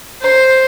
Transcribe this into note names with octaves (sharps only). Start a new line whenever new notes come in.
C5